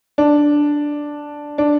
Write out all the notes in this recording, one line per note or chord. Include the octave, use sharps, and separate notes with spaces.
D4
D4